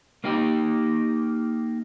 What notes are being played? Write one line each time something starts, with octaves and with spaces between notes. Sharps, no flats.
A#3 D#4 G4